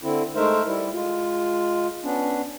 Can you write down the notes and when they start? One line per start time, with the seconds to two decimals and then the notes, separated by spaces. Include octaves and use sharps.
0.02 D3 C4 E4
0.35 G#3 A3 D#4 A#4 C5 E5
0.66 G3 E4
0.92 G#3 F4
2.04 B3 C#4 D4